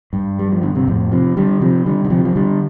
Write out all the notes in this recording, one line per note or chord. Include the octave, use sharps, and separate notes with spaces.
G2
G3
F3
D3
C3
F2 A2
C3 F3
D3 G3
C3 F3
D3 G3
D3
C3 F3
F3
D3 G3